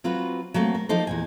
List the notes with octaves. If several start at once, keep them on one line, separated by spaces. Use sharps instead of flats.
F#3 C4 F4 F#4 B4
F#3 A3 A#3 C4
A#4
F3 A#3 D#4 A4 C5
E2 A#2 G#5